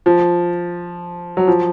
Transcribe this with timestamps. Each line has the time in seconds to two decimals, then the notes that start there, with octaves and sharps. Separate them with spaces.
0.06 F3
1.37 F#3
1.48 F3